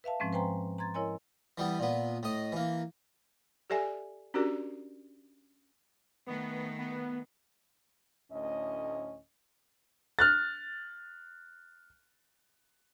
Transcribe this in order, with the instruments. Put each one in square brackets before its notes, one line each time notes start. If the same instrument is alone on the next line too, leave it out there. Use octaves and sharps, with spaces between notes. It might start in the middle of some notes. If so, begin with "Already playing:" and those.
[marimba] B4 E5 F5 A5
G#2 F3 G#3 C4 C#4
B4 C5 G5 G#5 A#5 C6
A#5 C6 G#6 A6
E4 A#4 C#5 D#5 G#5 C6
[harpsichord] E3 G3 B3
A#2 B3
A2 D#5
E3 A#3
[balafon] G4 A4 D5 E5 G#5
C#4 D4 F#4 G4 A#4 D5
[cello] D#3 A3 [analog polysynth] B3
[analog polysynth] B3
[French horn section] D2 A2 C#4 D#5
[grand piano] F6 F#6 A6